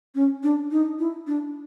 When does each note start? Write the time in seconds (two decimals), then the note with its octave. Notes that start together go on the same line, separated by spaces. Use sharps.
0.15 C#4
0.43 D4
0.71 D#4
0.99 E4
1.27 D4